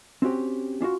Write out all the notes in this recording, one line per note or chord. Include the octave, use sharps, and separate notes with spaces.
C4 C#4 F#4 G4
C#4 D4 F4 F#4